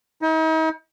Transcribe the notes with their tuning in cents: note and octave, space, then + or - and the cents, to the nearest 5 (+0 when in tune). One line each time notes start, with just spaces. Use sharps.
D#4 +40